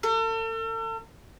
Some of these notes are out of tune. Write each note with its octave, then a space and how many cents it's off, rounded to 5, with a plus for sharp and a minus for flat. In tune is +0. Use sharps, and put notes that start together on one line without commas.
A4 +40